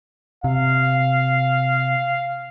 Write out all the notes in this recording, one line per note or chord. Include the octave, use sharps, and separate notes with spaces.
C3 F5